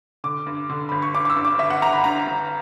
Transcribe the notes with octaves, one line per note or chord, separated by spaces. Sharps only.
D3 D6
G2
D3
G1 B5
C#6
G2 D6
D6
E6
G2
D6
G1 E5
F#5
G1 A#5
B5
G2 A#5
G1